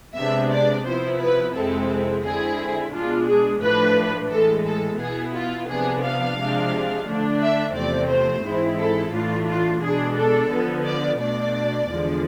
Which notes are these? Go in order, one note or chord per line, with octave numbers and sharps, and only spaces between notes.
C3 G#3 B3 D4 E5
D5
C3 F3 B3 E4 C5
B4
F2 C3 G#3 C4 E4 A4
D3 G#3 C4 E4 G#4
B2 G#3 D4 F4
G#4
A2 F3 A3 D4 B4
A2 E3 G#3 A4
A4
B2 B3 E4 G#4
F4
C3 F3 B3 D4 G#4
F5
C3 F3 G#3 D4
D3 A3 D4
E5
E2 C3 F3 A3 C4 D5
C5
G#2 E3 G#3 C4 E4
A4
A2 E3 A3 D4 F4
F4
B2 G#3 D4 G#4
A4
D3 F3 B3
D5
B2 A3 D4 D5
E2 D3 F3 G#3